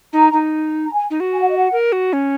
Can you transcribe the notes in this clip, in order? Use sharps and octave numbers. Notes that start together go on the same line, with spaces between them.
D#4 A#5
D#4
A#5
G#5
D#4
F#4
G#5
F#5
D#5
F#5
A#4
F#4
C#4